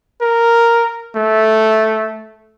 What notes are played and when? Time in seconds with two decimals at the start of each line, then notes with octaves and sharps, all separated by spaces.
0.22 A#4
1.16 A3